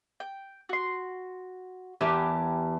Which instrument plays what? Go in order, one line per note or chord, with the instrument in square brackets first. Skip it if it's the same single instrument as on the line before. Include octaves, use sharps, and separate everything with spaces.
[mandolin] G5
F#4 C6
[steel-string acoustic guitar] E2 E3 A5 [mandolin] G4 A#4 G#5